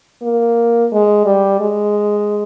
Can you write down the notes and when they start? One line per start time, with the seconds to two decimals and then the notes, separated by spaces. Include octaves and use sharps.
0.22 A#3
0.92 G#3
1.25 G3
1.60 G#3